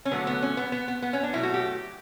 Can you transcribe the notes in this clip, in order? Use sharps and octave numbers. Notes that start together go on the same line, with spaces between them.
C#4
D3 F#3 A3 B3
B3
C#4
B3
B3
B3
B3
C#4
D4
B2 F#3 A3 E4
F#4
G4